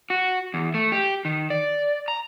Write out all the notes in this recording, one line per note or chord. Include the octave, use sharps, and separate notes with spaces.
F#4
E2
A3
G4
D#3
D5
A#5